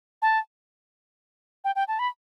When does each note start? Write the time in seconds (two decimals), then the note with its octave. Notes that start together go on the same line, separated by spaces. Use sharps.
0.22 A5
1.64 G5
1.76 G5
1.88 A5
1.99 B5